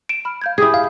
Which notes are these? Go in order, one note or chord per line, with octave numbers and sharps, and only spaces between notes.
D7 E7
B5 F6
F5 G6 G#6
E4 G4 G#4 D#6 G#6
F5